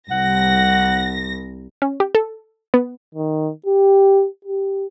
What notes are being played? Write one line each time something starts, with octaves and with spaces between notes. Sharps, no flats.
C2 F#5 A#6
C#4
G4
A4
B3
D#3
G4
G4